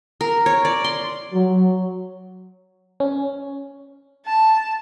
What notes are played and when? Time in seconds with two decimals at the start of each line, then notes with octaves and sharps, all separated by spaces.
0.21 A#4
0.46 C#5
0.65 D5
0.84 C6
1.32 F#3
3.00 C#4
4.26 A5